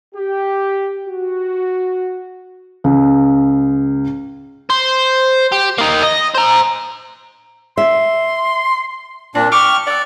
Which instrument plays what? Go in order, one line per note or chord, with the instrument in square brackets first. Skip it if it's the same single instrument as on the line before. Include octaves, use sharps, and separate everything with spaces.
[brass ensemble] G4
F#4
[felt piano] C#2
[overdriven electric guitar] C5
G4
A#3 D#4
D#5
C5 A#5
[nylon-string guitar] E5 [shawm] C6
[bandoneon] A#2 D4 [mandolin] C4
[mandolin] E5 G5 D6 [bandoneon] C#6 F6
[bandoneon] D5 [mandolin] F#5 E6